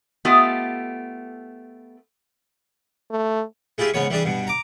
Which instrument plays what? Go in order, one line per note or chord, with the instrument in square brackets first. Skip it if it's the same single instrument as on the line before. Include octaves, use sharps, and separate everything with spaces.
[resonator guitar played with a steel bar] A3 B3 F4 G4 A4 D#5
[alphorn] A3
[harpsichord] G#3 E4 F4 G4 G#4
G#2 C#3 B3 C#5 C#6
E3 G3 D4 G#4
G2 B2
A#5 D6